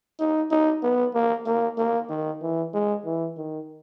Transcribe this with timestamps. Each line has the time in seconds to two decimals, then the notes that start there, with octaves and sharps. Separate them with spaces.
0.20 D#4
0.51 D#4
0.83 B3
1.14 A#3
1.46 A#3
1.78 A#3
2.09 D#3
2.42 E3
2.74 G#3
3.05 E3
3.37 D#3